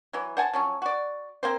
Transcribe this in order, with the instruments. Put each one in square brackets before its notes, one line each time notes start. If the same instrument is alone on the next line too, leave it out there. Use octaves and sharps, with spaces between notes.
[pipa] E3 F#3
C5 F#5 G#5 A5
F3 F#3 C#4
F#4 D5
A#3 C4 C5